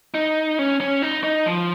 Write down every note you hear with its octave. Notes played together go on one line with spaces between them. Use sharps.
D#4
C#4
C#4
D#4
D#4
F3